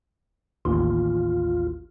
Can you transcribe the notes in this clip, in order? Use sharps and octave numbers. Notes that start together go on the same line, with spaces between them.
A1 D#2 F4